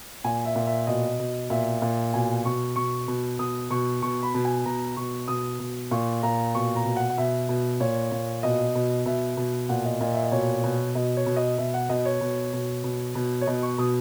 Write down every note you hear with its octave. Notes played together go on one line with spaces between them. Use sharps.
A#2 G#5
E5
A#2
E5
B2 D#5
B2
A#2 E5
A#2
B2 G#5
B2 C#6
B2 C#6
B2
B2 D#6
B2 C#6
B2 C#6
B5
B2
G#5
B2 A#5
B2 C#6
B2 D#6
B2
A#2 C#6
A#2 A#5
B2 C#6
A#5
B2
F#5
F#5
B2 E5
B2
A#2 C#5
A#2
B2 D#5
B2
B2 E5
B2
A#2 F#5
D#5
A#2 D#5
E5
D#5
B2 C#5
B2
B2 D#5
C#5
B2
D#5
B2 E5
F#5
B2 D#5
C#5
B2
B2
B2
B2
C#5
B2 D#5
C#6
B2 D#6